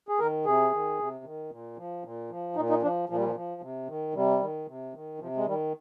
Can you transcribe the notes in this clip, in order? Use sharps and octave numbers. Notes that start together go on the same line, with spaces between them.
G#4
D#3 A#4
C3 G#4
D#3
C3
D#3
A#2
F3
A#2
F3
A#2 D#4
D#4
F3 D4
A#2 F3
G3
F3
F3
C3
D#3
C3 G3
D#3
C3
D#3
C3 F3
G#3
D#3 G3